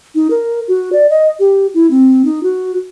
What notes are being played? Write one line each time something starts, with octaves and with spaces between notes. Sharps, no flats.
D#4
A#4
F#4
D5
D#5
G4
E4
C4
D#4
F#4